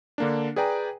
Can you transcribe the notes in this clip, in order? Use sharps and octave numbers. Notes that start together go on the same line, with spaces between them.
D3 A#3 D4
G#4 B4 D5 G5 G#5 A#5